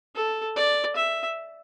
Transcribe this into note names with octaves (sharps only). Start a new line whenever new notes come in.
A4
D5
E5